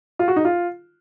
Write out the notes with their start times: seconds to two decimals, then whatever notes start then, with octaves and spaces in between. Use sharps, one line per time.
0.19 F4
0.28 F#4
0.36 D#4
0.45 F4